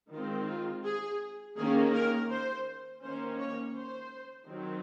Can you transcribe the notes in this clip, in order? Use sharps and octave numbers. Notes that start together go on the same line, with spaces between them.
D#3 G#3 C4 F4
F4
G#4
D#3 A#3 C#4 G#4
A#4
C5
D#3 A#3 C#4 C5
C#5
C5
D#3 F#3 C4